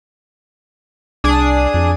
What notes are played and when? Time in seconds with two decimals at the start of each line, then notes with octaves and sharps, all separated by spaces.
1.24 C2 D4 G#4 D#6
1.74 F2